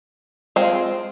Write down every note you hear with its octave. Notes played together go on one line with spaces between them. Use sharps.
G#3 C4 F4